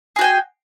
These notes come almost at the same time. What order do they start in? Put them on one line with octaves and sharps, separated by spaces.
G#4 F#4 G5 G#5